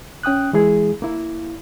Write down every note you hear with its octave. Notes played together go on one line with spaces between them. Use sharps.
C#4 G5 D#6 F#6
E3 G#3 E4 G#4
A#3 E4